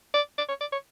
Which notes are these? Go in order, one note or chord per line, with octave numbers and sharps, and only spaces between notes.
D5
D5
C#5
D5
C#5